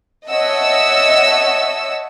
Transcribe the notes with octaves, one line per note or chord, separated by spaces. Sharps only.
C#5 D#5 E5 F#5 A5 E6